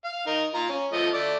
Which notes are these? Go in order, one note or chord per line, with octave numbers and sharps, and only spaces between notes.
F5
D#4 A#4
F4 A#5
C#4
F3 A3 D#5
A3 D5